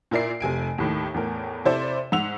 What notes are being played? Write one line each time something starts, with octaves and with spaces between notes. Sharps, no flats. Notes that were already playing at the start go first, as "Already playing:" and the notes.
A#2 E4 A#4 D5 C7
F1 C3 G#5 D7
D#2 A2 D#3
E2 A2 A#4
C3 E4 A4 C5 D5
G#2 F#5 E6 F7